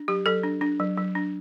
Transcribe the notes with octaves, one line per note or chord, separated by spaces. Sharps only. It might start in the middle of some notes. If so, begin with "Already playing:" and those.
Already playing: D4
F#3 G4
F#3 A4
D4
D4
F#3
F#3
D4